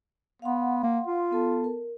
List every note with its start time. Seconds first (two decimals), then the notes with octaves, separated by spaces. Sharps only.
0.42 B3 F5 F#5 C6
0.84 A#3
1.07 F4
1.31 B3 A4 A5
1.64 A#4